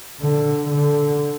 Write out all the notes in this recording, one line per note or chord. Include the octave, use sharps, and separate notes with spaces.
D3
D3